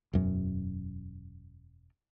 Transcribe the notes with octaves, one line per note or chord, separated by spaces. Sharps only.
E1 F#2